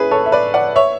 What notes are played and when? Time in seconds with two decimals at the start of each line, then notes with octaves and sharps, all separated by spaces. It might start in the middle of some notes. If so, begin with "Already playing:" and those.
Already playing: C#4 E4 G#4 B4
0.11 A4 C#5
0.26 E5
0.32 B4 D5
0.54 D5 F#5
0.76 C#5 E5